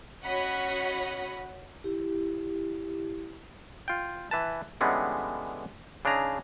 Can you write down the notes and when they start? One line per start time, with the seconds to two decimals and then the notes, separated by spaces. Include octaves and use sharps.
0.23 C#4 F#4 C#5 D#5 F#5 B5
1.84 E4 G4
3.88 F4 G5
4.31 E3 B4 A5
4.81 D3 E3 G3 G#3 B3 C#4
6.05 C#3 D4 D#4 G#4 A#5